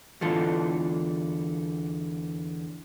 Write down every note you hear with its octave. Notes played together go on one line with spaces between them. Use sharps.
E2 D3 E3 D4 F4 A4